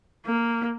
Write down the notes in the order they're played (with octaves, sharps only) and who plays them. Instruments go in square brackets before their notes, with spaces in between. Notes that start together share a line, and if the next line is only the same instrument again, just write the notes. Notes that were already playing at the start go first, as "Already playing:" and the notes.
[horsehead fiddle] A#3